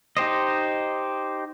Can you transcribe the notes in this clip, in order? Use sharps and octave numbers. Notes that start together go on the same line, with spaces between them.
D#4 G4 C5 D#5